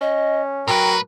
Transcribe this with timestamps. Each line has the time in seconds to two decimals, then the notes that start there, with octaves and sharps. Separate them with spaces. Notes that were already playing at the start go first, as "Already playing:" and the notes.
0.01 C#4 D#5
0.68 A2 F#3 A#4 B4 G5